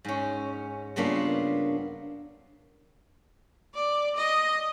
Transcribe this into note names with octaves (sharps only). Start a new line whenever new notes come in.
G#2 C#4
G2 C#3 A#3 B3 D4 F4
D5
D#5